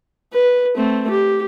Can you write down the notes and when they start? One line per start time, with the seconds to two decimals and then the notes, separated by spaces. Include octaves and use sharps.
0.33 B4
0.76 A3 C4
1.10 G4